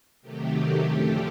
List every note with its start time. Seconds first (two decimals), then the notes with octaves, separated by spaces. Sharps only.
0.21 C3 D#3 F#3 A3 G4
0.82 F#2 D3 F3 A3